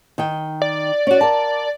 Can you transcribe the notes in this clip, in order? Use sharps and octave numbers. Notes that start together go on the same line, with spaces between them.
D#3 D#5 G5
D5
C#4 F#4
A#4 A5